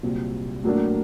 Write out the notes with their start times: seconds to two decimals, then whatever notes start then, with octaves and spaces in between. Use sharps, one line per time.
0.03 C2 A#2 F#3 C4
0.64 A2 F#3 A#3 D4